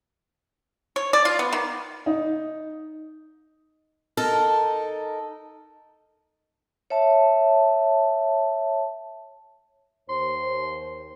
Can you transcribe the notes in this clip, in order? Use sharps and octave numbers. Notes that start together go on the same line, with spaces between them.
C#5
D5
F4
B3
D#3
D#4
D#4 A4 A#4
C#5 E5 A5
D#2 C5 C6